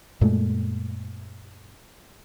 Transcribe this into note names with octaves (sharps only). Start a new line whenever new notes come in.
F#2 A#2 G#3 A3